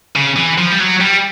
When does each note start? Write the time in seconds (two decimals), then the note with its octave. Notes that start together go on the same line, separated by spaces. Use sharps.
0.16 C#3
0.36 E3
0.58 F3
0.71 G3
0.80 F#3
1.01 G3